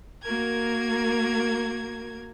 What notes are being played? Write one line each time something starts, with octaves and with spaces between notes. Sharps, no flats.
A#3 F#4 A#4 G#6